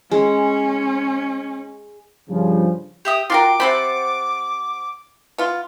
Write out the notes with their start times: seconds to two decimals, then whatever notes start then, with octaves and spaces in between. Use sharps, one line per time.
0.11 G#3 C#4
2.30 G2 C#3 F3
3.05 G4 E5 D#6
3.30 F4 F#4 A#4 G5 C6 D6
3.60 C3 C4 C5 F#5 A5 B5
5.38 B3 F4